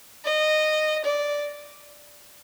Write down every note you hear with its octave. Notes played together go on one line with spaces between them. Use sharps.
D#5
D5